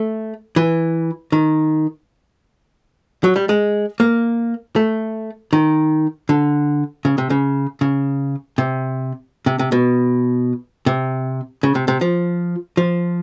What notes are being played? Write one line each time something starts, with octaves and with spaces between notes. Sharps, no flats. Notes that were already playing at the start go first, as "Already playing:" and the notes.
Already playing: A3
E3
D#3
F#3
G3
G#3
A#3
A3
D#3
D3
C#3
C3
C#3
C#3
C3
C3
C3
B2
C3
C#3
C3
C3
F3
F3